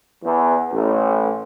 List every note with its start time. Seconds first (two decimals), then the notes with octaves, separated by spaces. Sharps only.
0.24 E2
0.73 A1